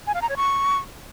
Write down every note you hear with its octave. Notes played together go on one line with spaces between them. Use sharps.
G#5
F5
A#5
C#5
C#6